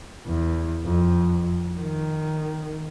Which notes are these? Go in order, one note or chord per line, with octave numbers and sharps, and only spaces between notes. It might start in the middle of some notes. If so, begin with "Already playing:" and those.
E2
F2
D#3